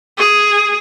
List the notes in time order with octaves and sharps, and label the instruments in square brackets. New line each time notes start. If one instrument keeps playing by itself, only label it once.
[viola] G#4